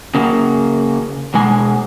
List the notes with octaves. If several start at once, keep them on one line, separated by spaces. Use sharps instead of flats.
C#3 A#3
B2 G#3 G#5